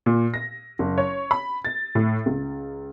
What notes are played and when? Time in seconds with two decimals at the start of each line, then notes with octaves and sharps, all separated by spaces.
0.06 A#2
0.34 A#6
0.79 F#1
0.98 C#5
1.31 B5
1.65 A6
1.95 A2
2.26 C#2